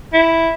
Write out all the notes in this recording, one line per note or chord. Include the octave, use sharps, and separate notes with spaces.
E4